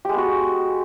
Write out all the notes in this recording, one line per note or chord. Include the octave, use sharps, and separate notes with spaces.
G#3 B3 F#4 G4